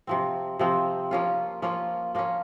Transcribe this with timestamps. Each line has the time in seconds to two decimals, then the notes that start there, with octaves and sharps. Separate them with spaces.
0.07 C3 F3 C4
0.59 C3 F3 C4
1.11 F3 A#3 C#4 F4
1.62 F3 A#3 C#4 F4
2.15 F3 A#3 C#4